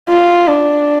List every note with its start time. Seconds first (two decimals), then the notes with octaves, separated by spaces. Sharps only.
0.09 F4
0.48 D4